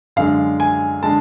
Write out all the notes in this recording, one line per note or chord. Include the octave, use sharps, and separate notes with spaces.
F#2 D3 G#3 F5
G#5
D3 G#3 A5